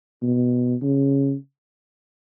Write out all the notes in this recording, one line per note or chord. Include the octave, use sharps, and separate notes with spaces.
B2
C#3